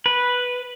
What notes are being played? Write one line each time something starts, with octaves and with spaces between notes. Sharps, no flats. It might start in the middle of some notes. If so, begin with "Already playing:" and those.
B4